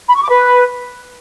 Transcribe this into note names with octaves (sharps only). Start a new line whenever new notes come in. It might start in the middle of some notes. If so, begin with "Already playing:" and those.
B5
C#6
D6
B4